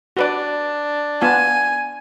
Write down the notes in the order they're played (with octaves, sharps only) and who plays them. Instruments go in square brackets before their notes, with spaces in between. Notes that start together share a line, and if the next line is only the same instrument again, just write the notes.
[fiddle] D4 [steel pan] F#4 B4 D5
[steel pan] B3 F4 A5 [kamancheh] G#5